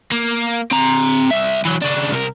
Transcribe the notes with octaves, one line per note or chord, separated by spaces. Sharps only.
A#3
C4 A#5
C2 E5
E3 F#3
C#3 D4
C2 A#4